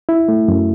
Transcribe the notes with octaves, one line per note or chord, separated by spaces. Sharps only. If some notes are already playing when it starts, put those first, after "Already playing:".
E4
A3
F#2